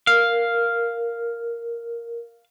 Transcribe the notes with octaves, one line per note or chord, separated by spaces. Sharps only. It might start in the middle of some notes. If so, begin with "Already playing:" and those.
A#4 F5